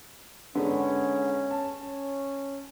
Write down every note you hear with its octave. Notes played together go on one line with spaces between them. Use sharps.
G#2 D3 B3 C#4
A5
C#4